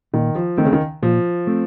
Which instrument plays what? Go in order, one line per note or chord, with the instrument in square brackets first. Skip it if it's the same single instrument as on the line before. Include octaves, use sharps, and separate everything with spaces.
[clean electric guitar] A#2 [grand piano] D#3
[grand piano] F3
[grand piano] D#3 [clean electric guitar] A3 C4
[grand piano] C#3
D#3
[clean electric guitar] A#2 [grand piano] F3
[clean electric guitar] A3 C4